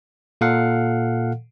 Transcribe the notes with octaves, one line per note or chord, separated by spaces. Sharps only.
A#2 A4 F5 F#5